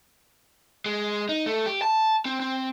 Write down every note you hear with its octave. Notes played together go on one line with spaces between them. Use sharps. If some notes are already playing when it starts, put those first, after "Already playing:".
G#3
D#4
A3
G4
A5
C4
C4